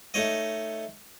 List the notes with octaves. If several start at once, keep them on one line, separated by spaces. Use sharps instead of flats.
A3 D#4 C#5 D#5